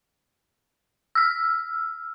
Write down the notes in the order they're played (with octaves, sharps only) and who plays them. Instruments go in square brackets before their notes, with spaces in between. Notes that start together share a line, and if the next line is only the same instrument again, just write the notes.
[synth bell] E6 F6